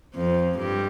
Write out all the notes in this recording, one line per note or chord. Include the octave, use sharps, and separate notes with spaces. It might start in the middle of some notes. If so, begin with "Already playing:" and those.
F2 F3
G2 G3